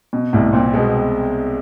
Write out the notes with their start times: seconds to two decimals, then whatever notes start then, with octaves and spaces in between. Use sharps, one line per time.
0.13 B2
0.33 C2 A2
0.53 A#2 C4
0.74 B2 G#3